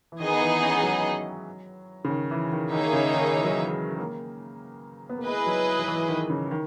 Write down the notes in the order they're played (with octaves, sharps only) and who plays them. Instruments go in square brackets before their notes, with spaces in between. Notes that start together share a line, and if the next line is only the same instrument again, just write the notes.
[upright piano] E3
[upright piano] D#3 [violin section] B3 D#4 G#4 D#5
[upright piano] E3
C#4
G#3
F#3
C#3
D#3
E3
D#3
[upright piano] D#3 [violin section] A#3 D#4 G#4 C#5 E5
[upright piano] C#3
D#3
E3
F#3
E3
G#3
G#3
A#3
B3
A#3
[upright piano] G#3 [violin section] E4 G#4 B4 D#5
[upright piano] F#3
F#3
E3
D#3
C#3
D#3